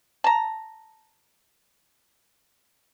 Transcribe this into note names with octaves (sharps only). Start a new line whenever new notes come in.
A5 A#5